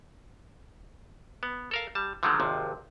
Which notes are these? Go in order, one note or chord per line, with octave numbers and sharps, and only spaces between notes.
B3
A4 A#4 F5
G3 A5
D3 D#3 F3 F#3 G#3 A3
G#1 D#2 C3 F3